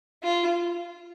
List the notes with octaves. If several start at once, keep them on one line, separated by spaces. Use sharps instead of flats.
F4